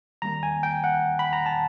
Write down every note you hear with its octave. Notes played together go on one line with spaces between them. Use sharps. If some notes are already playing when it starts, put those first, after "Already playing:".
D#3 G3 A#3 A#5
G#5
G5
F#5
B5
A#5
A5